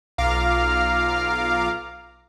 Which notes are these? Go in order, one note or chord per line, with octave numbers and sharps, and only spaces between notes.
B1 F4 F5 A#5 D6 F6